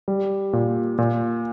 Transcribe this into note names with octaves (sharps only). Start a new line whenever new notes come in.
G3
A#2
A#2